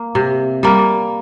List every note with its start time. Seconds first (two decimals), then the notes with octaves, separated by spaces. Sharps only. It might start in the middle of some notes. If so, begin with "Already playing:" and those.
Already playing: A#3
0.15 C3
0.63 G3 A#3